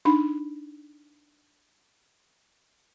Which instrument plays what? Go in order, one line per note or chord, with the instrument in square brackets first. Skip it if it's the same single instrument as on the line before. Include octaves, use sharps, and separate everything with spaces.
[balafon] D4 D#4 B5